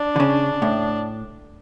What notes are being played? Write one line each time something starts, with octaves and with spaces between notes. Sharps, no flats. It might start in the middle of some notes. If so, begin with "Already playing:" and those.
Already playing: D4
D3
C#3
A2